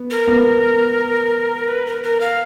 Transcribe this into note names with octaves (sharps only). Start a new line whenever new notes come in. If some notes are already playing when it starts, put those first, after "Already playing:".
Already playing: B3
A#4
B3
B4
A#4
A#4
F5